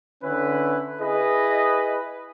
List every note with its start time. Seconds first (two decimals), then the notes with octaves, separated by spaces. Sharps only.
0.23 D3 C#4 E4 B4
1.01 E4 G#4 B4 D#5